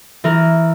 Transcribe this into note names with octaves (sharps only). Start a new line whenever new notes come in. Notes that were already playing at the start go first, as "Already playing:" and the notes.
E3 A#4